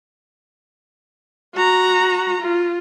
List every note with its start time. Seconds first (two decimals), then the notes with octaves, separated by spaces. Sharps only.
1.55 F#4 A#5
2.41 F4